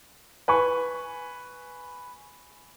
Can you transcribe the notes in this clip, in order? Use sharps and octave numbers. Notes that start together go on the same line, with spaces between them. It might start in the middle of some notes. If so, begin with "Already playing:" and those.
B4 G#5 C#6